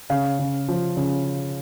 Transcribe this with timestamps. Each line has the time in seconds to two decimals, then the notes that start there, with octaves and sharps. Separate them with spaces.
0.10 C#3 F5
0.39 C#3
0.68 F3
0.97 C#3